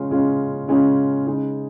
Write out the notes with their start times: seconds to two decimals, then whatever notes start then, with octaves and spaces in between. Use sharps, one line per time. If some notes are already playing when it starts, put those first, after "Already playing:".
Already playing: C#3 G#3 C#4 F4
0.10 C#3 G#3 C#4 F4
0.68 C#3 G#3 C#4 F4
1.27 C#3 G#3 D#4